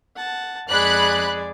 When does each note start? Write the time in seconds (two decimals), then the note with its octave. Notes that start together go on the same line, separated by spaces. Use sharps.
0.16 F#5 A5
0.69 F2 G#3 D5 B5 F#6